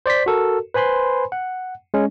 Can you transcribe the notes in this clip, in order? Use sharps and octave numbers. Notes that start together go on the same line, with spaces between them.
C5 D5 C6 B6
F#4 A4 A#4
B4 C5 G#5 B5 C6
F#5
G#3 C#4